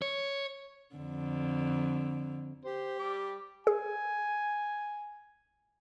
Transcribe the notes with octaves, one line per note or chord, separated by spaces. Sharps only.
C#5
F2 D3
G4 C5
G3 D6
G#4 G#5